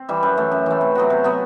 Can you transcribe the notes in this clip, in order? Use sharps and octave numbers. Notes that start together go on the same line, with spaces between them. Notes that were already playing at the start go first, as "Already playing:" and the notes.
Already playing: C4
E3 G3
F#2
E3 A3
F#2
E3 A3
C3
F#3 B3 F#4
C3
F#3 B3 F#4